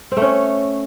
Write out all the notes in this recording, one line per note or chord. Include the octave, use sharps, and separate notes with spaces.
C4
A3
C#4